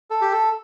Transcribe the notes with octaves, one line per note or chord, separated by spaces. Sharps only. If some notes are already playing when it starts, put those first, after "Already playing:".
A4
G4
A4